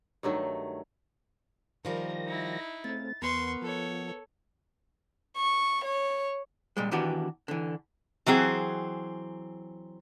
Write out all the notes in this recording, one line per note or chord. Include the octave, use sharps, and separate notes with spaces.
G2 D#3 F#3 A3
D#3 F3 G3 A#4 A#6
D#4 E4
C#3 A3 C4 A6
E2 B3 A#4 B4 C6 C#6
F3 A4 C#5
C#6
C#5
A#2 G3 G#3
D#3 E3 B3 D4 F#4 G4
D3 E3
E3 F#3 C4 G#4